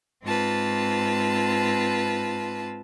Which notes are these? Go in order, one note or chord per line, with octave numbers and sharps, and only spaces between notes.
G#2 C4 F4 B4 A5